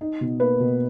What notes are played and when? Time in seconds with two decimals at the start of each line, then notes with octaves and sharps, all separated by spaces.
0.01 D#4
0.21 B2
0.40 A#3 B4
0.60 B2